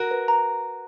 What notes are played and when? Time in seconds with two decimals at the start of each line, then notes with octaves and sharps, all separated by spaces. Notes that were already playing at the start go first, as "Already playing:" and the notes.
Already playing: F#4 A#4
0.11 B4
0.28 A#5